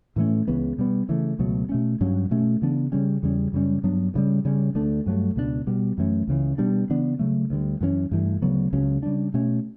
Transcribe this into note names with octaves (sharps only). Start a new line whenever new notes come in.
A2 E3 A3 C#4
C#2 C#3 E3 B3
B2 G3 B3
C#3 E3 A3
C#2 B2 F#3 A3
B2 A3 C#4
G2 F#3 C#4
B2 A3 C#4
C#3 E3 B3 D4
C#3 G3 C#4
E2 C#3 G3 C#4
F#2 C#3 G3 C#4
G2 F#3 B3 D4
D2 C#3 G3
C#3 G3 C#4
D2 D3 A3 D4
G2 F#3 A3
C#2 B2 G3 D4
B2 G3 B3
F#2 E3 A3 C#4
C#2 C#3 E3
B2 G3 B3 D4
C#3 E3 B3 D4
C#3 F#3 A3
D2 D3 G3
F#2 E3 A3 C#4
G2 E3 A3
D2 C#3 F#3 B3
C#2 C#3 F#3 C#4
C#3 G3 D4
B2 A3 C#4